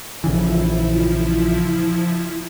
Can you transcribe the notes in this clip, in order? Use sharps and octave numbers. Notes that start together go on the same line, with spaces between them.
A#1 C#3 E3 F3 E4